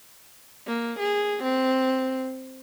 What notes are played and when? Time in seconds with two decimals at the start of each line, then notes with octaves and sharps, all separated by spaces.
0.67 A#3
1.00 G#4
1.44 C4